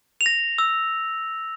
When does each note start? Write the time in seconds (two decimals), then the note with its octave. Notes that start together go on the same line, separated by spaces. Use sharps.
0.21 F7
0.26 A#6
0.58 E6